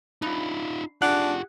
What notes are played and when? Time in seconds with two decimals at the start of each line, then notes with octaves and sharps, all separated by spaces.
0.22 G2 D#4 F4
1.02 D4 F4 G4 G#4 F#5 F#6